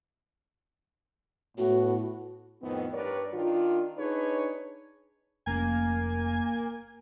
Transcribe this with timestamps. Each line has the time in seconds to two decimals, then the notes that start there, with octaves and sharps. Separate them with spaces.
1.58 A2 B3 F#4
2.62 F2 A2 D#3 B3 C4
2.93 G2 A#4 B4 C#5 D5
3.33 D#3 D4 F4
3.97 D4 D#4 G#4 B4 C#5
5.47 F1 A#3 C#4 G#5